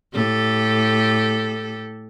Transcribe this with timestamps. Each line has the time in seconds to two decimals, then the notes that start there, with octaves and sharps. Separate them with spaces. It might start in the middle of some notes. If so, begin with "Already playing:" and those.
0.13 A2 G4 A4